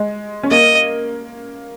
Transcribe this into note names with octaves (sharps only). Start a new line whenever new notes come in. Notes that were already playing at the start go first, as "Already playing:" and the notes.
Already playing: G#3
C#4
A#3 D#5